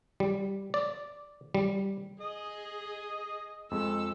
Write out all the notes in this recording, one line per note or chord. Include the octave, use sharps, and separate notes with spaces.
G3
D5
G3
G#4 D#5
F2 G#3 A4 E6